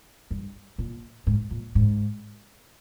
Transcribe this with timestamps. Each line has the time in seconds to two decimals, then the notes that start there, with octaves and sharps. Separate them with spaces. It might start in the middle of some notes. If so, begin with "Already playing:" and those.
0.31 G2
0.78 A#2
1.27 G#2
1.51 A#2
1.75 G#2